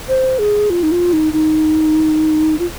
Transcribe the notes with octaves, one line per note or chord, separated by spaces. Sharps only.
C5
G#4
F4
D#4
F4
D#4
D#4
F4